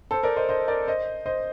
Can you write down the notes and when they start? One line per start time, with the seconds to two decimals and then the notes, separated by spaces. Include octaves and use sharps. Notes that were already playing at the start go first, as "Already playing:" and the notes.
0.11 A4 C5
0.23 A#4 D5
0.36 C5 D#5
0.49 C5 D#5
0.68 A#4 D5
0.87 C5 D#5
1.26 C5 D#5